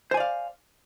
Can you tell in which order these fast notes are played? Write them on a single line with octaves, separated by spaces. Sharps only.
C5 G#5 D5 F5